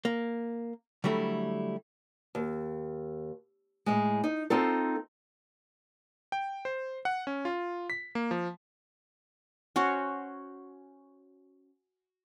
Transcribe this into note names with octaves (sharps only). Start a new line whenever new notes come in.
A#3
D3 F#3 G3 A3 E4
D#2
A2 G#3
D#4
C4 D#4 F4 A4
G5
C5
F#5
C#4
F4
B6
A#3
F3
C#4 F#4 C5 C#5